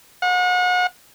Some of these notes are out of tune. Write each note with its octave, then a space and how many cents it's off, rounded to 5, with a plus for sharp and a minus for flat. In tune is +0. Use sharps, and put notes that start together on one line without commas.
F#5 -40